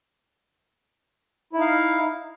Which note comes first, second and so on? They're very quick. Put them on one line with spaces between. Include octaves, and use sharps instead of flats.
E4 D#4 F5